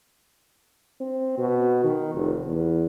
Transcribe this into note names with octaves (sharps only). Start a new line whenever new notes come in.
C4
B2
D#3
F1
E2